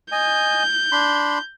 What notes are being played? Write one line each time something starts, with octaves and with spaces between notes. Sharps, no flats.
D#5 G#5 G6
D4 B5 C6